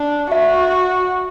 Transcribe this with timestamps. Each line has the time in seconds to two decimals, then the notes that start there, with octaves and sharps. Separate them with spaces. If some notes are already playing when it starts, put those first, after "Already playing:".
Already playing: D4
0.31 F#4 E5